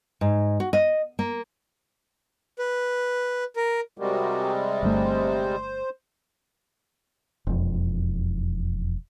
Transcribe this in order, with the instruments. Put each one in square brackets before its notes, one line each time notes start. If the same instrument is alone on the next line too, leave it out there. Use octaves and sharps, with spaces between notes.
[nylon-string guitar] G#2
F#4
D#5
A#3
[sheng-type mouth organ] B4
A#4
[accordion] C3 G3 G#3 [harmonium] F#4 G4 A#4
[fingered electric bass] G1 G2 A3 [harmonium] C5
[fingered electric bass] E1 F2